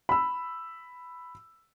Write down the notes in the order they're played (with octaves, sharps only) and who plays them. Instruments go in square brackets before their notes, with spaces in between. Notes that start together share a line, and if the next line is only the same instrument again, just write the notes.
[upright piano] B5 E6